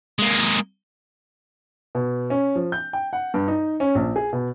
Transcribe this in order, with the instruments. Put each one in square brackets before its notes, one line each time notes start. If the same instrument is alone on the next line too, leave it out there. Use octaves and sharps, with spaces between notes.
[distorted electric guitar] G#3 A#3
[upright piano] B2
C#4
F3
G6
G5
F#5
G2
D#4
C#4
A#1
G#4
B2